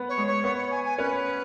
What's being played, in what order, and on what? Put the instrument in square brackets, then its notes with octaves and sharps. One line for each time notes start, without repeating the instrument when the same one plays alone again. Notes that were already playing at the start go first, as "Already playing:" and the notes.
Already playing: [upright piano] B3 B4
[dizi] C#5
[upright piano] G#3
[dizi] C#5
[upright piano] B3 [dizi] C#5
[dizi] C#5
G#5
G#5
[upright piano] C#4 [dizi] B4